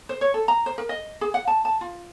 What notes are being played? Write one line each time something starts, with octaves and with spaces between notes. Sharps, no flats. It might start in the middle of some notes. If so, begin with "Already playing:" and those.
C5
C#5
A4
A#5
C5
A#4
D#5
G#4
F#5
A5
A5
F4